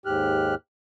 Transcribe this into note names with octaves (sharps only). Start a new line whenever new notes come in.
D#2 G#2 G4 F6 F#6